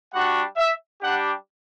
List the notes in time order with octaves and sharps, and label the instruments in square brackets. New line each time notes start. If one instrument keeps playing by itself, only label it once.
[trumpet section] G3 D4 F#4 F#5
E5
G3 D4 G4 F#5